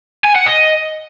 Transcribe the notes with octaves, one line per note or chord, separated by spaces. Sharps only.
G#5
F#5
D#5